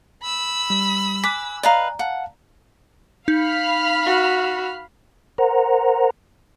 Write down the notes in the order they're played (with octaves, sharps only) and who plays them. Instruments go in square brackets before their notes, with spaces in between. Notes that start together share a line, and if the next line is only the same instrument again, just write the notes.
[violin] B5 E6
[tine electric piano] G3
[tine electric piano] G#5 F#6 [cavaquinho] D6 [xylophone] B6
[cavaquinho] B4 D#5 F5 [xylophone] D5 A#5
[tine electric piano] F5 A5 [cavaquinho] F#5
[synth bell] D#4 [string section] F5 B5 F6
[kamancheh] F#4
[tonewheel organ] A#4 C5 F#5 A#5